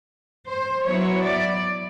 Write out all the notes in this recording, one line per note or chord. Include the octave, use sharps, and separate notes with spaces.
C5
F#3 B3 E4 C#5
D5